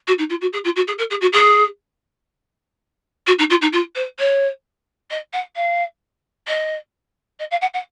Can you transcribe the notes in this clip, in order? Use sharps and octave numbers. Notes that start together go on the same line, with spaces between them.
F#4
D#4
F4
F#4
G#4
F4
F#4
G#4
A#4
G#4
F#4
G#4
F#4
D#4
F4
D#4
F4
C5
C#5
D#5
F#5
F5
D#5
D#5
F5
F#5
F#5